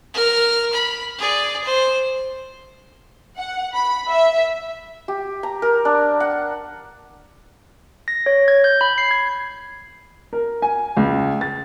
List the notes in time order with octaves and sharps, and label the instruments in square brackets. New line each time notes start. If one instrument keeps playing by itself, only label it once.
[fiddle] A#4 F6
B5
G#4 D5
C5
[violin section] F#5
B5
E5
[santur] G4
A#5
A#4
D4
F#5
[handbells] A#6
C#5
G#6
G6
B5
C7
G#6
[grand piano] A#4
G#5
C#2
A6